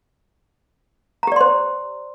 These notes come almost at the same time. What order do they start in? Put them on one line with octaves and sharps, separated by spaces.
A#5 G4 D5 C6 C5